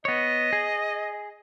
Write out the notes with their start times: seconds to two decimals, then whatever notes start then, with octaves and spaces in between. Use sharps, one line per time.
0.05 B3 C#5 D#5
0.53 G#4